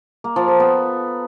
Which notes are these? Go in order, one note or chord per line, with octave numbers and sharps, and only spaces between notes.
A#3
F3
A4
B3